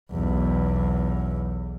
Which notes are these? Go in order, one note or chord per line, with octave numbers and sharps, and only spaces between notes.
B1 E2